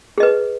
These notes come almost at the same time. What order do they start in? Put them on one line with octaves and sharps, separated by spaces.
G#4 D#5 B4